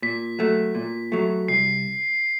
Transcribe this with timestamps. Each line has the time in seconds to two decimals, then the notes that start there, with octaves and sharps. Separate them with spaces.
0.02 A#2 B6
0.39 F#3 A3
0.75 A#2
1.12 F#3 A3
1.48 C2 C7